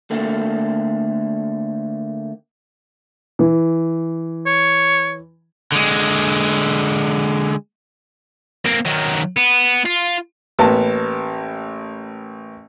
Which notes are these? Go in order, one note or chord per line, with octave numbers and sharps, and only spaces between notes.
D3 A3 A#3 C4
E3
C#5
D3 G#3
A#3 C4
D#3 F#3
B3
F4
A1 A#3 B3 A5